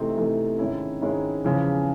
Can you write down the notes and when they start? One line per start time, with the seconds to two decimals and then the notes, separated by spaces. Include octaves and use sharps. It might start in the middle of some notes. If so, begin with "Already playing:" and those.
Already playing: C3 E3 A3 C4 D#4
0.16 C3 E3 A3 C4 D#4
0.59 G#2 D#3 G#3 C#4 E4
1.01 G#2 D#3 G#3 C#4 E4
1.44 E2 C#3 F3